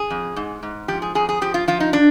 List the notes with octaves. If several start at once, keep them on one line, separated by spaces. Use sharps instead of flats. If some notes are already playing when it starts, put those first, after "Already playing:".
Already playing: G#4
F2
G#2
G#2
F3 G4
G#4
F2 G#4
G#4
F3 G4
F4
F3 F4
D#4
D4